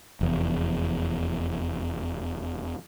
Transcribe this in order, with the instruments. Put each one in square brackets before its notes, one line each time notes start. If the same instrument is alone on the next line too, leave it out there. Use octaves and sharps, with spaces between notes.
[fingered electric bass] F1 E2